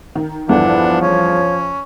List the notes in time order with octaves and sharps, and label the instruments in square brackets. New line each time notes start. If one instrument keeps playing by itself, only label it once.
[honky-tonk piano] D#3
[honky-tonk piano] E2 G2 D3 [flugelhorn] F3 [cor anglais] D4 [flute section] E4 B4 F#5
[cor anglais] C#4 [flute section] C#5